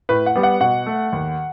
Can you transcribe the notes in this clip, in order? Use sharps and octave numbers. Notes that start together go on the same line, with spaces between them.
A2 B4
F#5
G3 B3
F#5
B2 F#5
A3
D#2